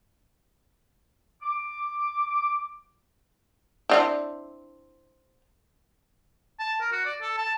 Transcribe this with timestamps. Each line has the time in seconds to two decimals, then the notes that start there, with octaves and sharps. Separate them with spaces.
1.42 D6
3.90 C4 D4 E4
6.59 A5
6.81 A#4
6.92 F#4
7.06 D5
7.21 A4
7.38 A5